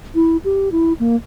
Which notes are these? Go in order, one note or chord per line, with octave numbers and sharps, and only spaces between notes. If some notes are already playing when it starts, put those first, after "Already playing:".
E4
G4
E4
A#3